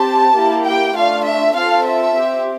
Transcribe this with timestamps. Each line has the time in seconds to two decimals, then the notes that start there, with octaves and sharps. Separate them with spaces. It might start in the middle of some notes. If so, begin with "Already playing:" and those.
Already playing: C4 G4 A5
0.35 A#3 E4 G4
0.65 G5
0.95 A3 D4 F4 F5
1.25 E5
1.55 C4 F4 A4 F5
1.85 E5
2.15 C4 G4